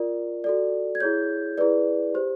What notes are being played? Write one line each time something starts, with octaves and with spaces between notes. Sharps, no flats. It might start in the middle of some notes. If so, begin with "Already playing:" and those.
Already playing: F4 A#4 D5
F#4 A4 D5
G#6
E4 G#4 C#5 G6
E4 G#4 B4 D5
G4 C5